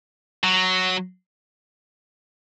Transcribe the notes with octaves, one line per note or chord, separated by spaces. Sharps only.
F#3